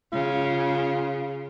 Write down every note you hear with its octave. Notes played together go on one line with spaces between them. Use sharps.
C#3 F4